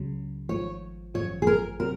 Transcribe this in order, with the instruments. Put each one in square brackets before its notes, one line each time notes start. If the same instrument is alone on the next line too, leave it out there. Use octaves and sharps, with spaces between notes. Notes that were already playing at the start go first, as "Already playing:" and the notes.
Already playing: [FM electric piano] C#2 C#3 F#3
[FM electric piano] G#1 G#2 F3 [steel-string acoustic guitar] C#5
[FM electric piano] G#1 F#2 F3 [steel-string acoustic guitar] C#5
[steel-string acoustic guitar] G#4
A#4
[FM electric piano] C3 F#3 [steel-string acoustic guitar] A#4